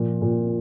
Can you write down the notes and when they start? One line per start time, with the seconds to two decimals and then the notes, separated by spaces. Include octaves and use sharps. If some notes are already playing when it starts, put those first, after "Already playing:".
Already playing: A#2 F3
0.21 A#2